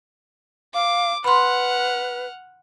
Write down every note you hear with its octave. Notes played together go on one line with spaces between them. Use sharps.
F5 D6
B4 F#5 B5 C6 F6